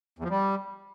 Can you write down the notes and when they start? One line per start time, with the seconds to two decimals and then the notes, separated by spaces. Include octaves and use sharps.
0.19 E2
0.24 F3
0.30 G3